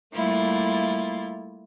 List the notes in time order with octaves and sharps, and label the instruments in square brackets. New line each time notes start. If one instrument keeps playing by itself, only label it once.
[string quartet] G3 A3 A#3 E4 F4